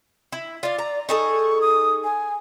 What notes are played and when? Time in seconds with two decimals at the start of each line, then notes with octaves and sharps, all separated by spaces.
0.32 E4
0.63 F4 D5 F5
0.79 A#5
1.09 D#4 G#4 A4 C#6
1.61 D#6
2.04 G#5